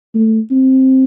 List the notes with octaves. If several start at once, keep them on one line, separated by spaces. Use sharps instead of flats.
A3
C4